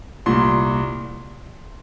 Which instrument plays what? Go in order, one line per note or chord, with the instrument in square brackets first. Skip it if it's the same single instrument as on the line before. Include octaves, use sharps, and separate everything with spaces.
[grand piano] C2 A#2 C6